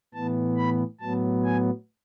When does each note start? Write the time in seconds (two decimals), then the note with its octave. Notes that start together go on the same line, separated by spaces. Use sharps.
0.14 A2 E3 B3 A5
0.57 B5
1.00 A2 F#3 B3 A5
1.44 G#5